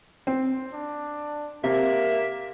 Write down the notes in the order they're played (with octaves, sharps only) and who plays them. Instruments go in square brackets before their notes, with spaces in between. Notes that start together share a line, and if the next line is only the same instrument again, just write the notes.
[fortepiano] C4
[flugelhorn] D4
[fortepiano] C3 [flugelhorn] A#3 [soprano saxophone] E5